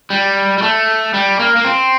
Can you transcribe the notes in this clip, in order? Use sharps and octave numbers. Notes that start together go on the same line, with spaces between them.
G3
G3
A3
G3
A#3
A#3
C4